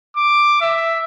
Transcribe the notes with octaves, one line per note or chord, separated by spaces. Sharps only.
D6
E5